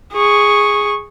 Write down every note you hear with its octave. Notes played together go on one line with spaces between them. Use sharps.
G#4 C#6